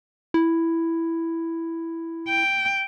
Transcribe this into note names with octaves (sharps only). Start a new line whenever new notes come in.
E4
G5